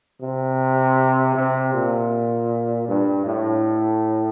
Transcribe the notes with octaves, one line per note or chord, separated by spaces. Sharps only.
C3
C3
A#2
G2
A2